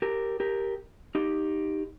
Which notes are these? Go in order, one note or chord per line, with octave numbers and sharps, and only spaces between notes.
G4 A#4
G4 A#4
D#4 G4